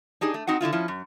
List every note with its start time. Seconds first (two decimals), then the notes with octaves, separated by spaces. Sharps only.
0.21 D4 D#4 G4 G#4
0.34 A3
0.47 C4 D#4 F#4 F#5
0.61 D3 C4 E4 F4
0.73 F3 C#4 E4
0.88 F#2